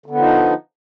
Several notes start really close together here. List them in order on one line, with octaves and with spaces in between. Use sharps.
D3 B3 F3 D#4